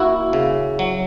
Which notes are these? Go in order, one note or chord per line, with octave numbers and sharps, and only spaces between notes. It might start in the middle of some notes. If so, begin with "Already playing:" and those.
Already playing: A#3 E4 F#4
C#3
F#3